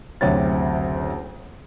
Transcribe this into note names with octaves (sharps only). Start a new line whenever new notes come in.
F#1 D2 C3 C#5 A6